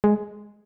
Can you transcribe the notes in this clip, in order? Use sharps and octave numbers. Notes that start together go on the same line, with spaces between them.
G#3